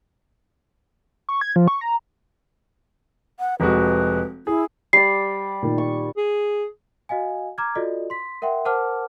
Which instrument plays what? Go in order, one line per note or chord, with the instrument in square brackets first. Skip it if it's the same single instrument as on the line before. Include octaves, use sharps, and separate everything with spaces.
[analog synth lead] C#6
G#6
F3
C#6
A#5
[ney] F#5
[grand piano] F1 G#3 F#4 [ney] B4
[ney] E4 [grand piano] G#4
[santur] G3 D5 [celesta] C7
[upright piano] A#2 D#3
[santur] C#6
[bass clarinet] G#4
[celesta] F#4 D#5 F5 G#5
A#5 D6 F6 G#6
F4 F#4 A4 D5 D#5
C6 B6
A#4 E5 F#5 G5 C6
A#4 C5 F#5 A5 D6 F6